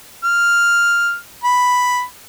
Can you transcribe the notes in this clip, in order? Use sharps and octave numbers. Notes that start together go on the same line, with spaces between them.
F6
B5